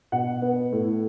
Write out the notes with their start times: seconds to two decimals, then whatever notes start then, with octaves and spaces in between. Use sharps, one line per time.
0.12 B2 F#5
0.42 B3
0.72 A2